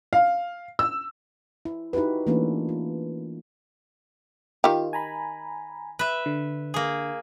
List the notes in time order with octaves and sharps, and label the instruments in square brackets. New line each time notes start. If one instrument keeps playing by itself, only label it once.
[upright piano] F5
E6
[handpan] E4
D#4 E4 F#4 G4 B4
E3 A3 A#3 C#4 D4 F4
F4
[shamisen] D#3 G4 [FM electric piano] F4
[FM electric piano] G#5 A#5 B5
[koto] B4 E5
[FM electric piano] D3
[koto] A#3 G#4